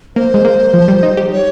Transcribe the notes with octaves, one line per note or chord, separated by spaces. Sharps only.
A#3 C5
G#3
A#3
F3
G3
D#4
G4
C#5